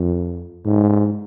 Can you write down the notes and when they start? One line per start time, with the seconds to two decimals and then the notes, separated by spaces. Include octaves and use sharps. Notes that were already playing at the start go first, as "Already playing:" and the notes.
Already playing: F2
0.65 G#2